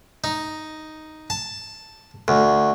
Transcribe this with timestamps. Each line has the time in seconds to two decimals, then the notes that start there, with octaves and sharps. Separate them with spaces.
0.24 D#4
1.30 A5
2.28 D2